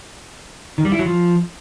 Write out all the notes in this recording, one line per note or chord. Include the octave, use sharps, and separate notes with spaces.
D#3
G3
E4
F#3
F3